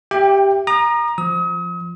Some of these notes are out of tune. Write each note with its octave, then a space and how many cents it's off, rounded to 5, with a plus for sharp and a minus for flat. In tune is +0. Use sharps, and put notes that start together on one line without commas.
G4 +0 E5 +10 G5 +25
A#5 +15 D#6 -35
F3 +0 D#6 +40